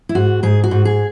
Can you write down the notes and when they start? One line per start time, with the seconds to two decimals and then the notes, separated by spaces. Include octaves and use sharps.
0.09 E4
0.15 G#2 F#4
0.43 G#2 G#4
0.64 F#4
0.71 G#2
0.85 G#4